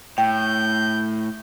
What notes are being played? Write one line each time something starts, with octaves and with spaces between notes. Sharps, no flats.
A2 G5 G6